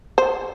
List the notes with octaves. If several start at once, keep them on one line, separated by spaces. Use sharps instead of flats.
C5